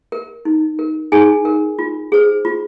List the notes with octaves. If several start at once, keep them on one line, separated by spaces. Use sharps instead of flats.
A#4
D#4
A#4
D#4 G#4 G#5
A#4
F4
G#4 C5
F4